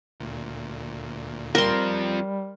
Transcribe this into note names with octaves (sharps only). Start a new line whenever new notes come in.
D2 A#2
F3 G3 C4 A#4 C6